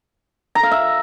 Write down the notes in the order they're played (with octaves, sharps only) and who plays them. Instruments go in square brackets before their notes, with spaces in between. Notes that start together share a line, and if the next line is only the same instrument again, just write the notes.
[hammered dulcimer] A#5
F5
E5